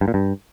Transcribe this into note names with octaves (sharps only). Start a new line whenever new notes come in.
G2
A#2
G2